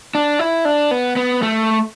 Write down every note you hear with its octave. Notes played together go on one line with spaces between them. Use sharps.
D4
E4
D4
B3
B3
A3